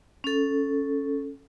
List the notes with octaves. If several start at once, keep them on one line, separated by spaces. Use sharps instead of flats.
C#4 A4